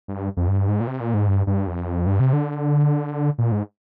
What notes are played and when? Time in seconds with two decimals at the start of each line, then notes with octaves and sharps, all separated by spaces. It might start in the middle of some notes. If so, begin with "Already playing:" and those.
0.08 G2
0.37 F2
0.48 G2
0.68 G#2
0.81 A#2
0.87 C3
1.01 A#2
1.14 G#2
1.28 G2
1.47 G2
1.67 F2
2.07 G2
2.20 C3
2.33 D3
3.38 A#2
3.52 G#2